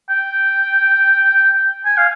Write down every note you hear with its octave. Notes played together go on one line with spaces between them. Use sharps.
G5
G#5
F5